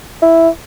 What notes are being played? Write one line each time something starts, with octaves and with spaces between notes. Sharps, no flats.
E4